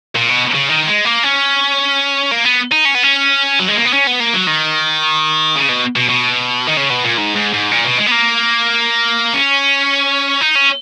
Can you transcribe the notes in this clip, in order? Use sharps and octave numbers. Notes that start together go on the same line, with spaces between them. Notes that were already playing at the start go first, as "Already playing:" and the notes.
A#2
B2
C#3
D#3
G#3
A#3
C#4
A#3
B3
D#4
C#4
B3
C#4
F#3
G#3
A#3
B3
C#4
B3
A#3
F#3
D#3
C#3
B2
B2
B2
D#3
C#3
B2
A#2
G#2
G#2
G#2
A#2
B2
G#3
B3
A#3
C#4
D#4
C#4